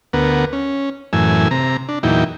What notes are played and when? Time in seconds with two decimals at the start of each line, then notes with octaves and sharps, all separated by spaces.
0.13 D2 B3 A#4 F#5
0.53 C#4
1.13 F#2 A2 E3 G#5 E6
1.51 C3 A#5
1.89 D4
2.03 E2 A#2 F#3 D#4 E4 G5